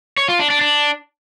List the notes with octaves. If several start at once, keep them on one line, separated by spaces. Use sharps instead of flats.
C#5
F4
D4
D4
D4